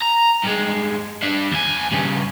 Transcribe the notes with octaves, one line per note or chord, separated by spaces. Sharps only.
A#5
G2 G#3
G3 D4
D#2 G#5
G2 C#3